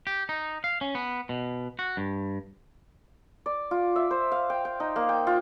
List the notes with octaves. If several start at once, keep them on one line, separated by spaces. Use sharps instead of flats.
G4
D#4
F5
C#4
B3
B2
F#4
G2
D5
F4
E5
C5
F5
G5
G5
D#4
A#3
G5
F4